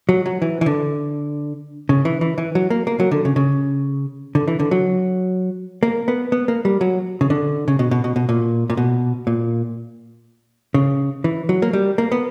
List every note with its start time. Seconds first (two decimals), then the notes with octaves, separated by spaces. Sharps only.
0.09 F#3
0.26 F#3
0.42 E3
0.61 E3
0.66 D3
1.89 C#3
2.05 E3
2.21 E3
2.38 E3
2.55 F#3
2.70 A#3
2.87 A#3
3.00 F#3
3.11 D3
3.25 C#3
3.36 C#3
4.35 D3
4.48 E3
4.59 D3
4.71 F#3
5.83 A#3
6.08 B3
6.32 B3
6.48 A#3
6.65 G3
6.81 F#3
7.21 C#3
7.30 D3
7.68 C#3
7.79 B2
7.91 B2
8.04 B2
8.16 B2
8.29 A#2
8.70 A#2
8.77 B2
9.27 A#2
10.74 C#3
11.24 E3
11.49 F#3
11.62 A#3
11.73 G3
11.98 A#3
12.12 B3